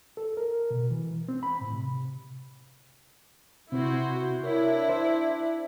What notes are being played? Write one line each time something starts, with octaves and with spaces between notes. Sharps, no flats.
A4
A#4
B2
E3
C4
B5
A2
C3
C3 C4 E4 F#4 C5
D4 E4 A#4 C#5
C5